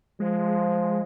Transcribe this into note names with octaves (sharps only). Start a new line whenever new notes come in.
F3 G#3